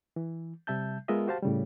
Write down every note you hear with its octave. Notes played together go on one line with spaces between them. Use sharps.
E3
C3 G3 E5 A5 G6
G#3 B3 F4 A#4 D#5 E5
F#4 G4 C5 F5 A5
A2 C#3 G3